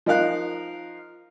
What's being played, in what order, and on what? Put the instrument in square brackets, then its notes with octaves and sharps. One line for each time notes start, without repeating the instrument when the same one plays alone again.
[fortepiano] F3 D#4 A#4 F5 F#6